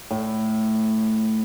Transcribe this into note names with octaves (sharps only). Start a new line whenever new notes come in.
A2